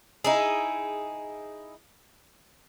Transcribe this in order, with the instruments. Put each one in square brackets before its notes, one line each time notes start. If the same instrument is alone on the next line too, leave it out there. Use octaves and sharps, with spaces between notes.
[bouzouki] D#4 E4 G#4